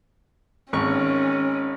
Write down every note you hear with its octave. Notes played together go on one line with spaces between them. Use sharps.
G#1 C#4 C#6